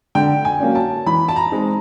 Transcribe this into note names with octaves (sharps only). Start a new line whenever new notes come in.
D3 G5
G#5
F#3 A#3 C#4
A5
E3 B5
A5
A#5
G#3 C4 D#4